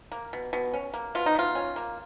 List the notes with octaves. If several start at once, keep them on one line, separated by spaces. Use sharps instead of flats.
A#3
B2
B2
C#4
A#3
B2 F4
D#4
B2 F4
C#4
A#3